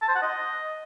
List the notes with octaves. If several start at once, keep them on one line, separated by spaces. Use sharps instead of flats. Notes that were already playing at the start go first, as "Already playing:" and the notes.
A5
C5
F#5
D#5